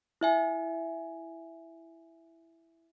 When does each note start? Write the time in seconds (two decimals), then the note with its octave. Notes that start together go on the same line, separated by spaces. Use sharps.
0.21 E4 E5 G#5